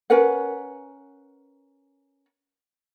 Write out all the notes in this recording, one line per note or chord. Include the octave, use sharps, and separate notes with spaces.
C#4 A#4 B4 F#5